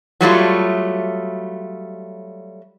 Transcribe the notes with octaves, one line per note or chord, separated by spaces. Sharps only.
F#3 G3 A3 F4